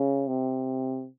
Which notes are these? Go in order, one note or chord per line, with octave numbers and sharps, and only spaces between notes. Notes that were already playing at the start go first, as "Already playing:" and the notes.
Already playing: C#3
C3